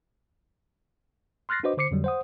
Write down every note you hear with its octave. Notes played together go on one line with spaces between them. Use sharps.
C6 F6 F#6 A6 A#6 C7
D4 F#4 B4 C5 D#5 D6
D3 C5 D6 C7 C#7
F2 D3 F#3 G3
C5 F#5 D#6